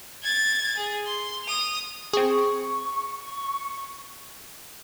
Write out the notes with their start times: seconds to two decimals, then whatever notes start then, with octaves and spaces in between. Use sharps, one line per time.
0.23 G#6 A6
0.77 G#4
1.06 C6
1.44 D#6 F7
2.13 C4 G#4 C#6